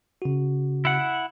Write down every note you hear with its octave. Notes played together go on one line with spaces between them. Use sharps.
C#3 F#4
E4 F#5